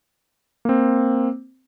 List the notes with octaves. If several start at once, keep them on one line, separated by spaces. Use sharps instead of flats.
A#3 C4